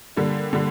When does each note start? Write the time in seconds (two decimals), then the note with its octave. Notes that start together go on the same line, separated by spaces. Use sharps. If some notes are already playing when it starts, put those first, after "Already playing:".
0.17 D3 G3 A#3
0.53 D3 G3